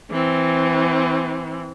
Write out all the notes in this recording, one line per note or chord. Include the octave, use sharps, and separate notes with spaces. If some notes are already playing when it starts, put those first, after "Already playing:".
E3 C4